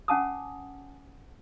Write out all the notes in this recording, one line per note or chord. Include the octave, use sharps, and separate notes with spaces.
C#4 F#5 G#5 A5 D6 D#6